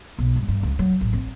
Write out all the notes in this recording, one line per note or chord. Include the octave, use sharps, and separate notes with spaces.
B1
G2
G2
C#2
F#3
A1
C4